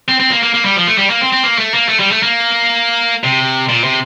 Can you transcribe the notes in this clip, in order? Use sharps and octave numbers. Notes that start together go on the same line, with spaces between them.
C4
C4
A#3
A#3
A#3
G3
F3
A3
G3
A#3
C4
C4
A#3
A3
A#3
A3
G3
A3
A#3
C3
A#2
C3